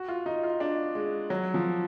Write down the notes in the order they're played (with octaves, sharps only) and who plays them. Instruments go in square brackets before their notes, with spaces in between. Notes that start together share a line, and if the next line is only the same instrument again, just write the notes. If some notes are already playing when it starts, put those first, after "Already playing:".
Already playing: [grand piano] F#4
F4
D#4
F4
D4
G#3
F#3
F3